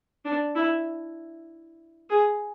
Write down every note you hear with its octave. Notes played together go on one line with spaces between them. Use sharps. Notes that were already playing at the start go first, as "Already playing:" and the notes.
D4
E4
G#4